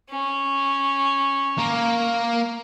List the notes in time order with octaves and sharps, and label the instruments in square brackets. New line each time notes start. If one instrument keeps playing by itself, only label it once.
[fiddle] C#4
[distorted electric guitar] A#3 A#4